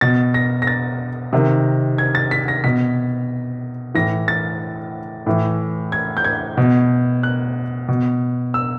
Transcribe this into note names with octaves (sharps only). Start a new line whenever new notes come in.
B2 A6
A#6
A#6
A6
C3 D#3
G#6
A6
B6
A#6
B2 B6
A2 E3 A#6
A6
A2 E3
G#6
G6
G#6
B2
F#6
B2
E6